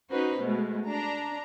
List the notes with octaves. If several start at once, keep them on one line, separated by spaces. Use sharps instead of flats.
C#4 D#4 F#4 B4 C5
B2 G#3 A3
D4 A#5